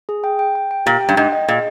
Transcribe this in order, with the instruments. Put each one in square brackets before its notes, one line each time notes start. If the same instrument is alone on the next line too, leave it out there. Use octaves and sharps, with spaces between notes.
[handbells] G#4
G5
G5
G5
G5
[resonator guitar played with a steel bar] A#2 [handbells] G4
[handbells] G5
[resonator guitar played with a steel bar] G2
[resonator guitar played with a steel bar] G#2 [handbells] G5
[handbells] D#5
[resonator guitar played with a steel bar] A#2 [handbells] G#4